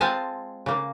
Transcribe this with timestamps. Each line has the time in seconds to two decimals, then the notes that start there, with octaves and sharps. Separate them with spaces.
0.01 G#3 C4 F4 G#5 A5
0.66 C#3 A#3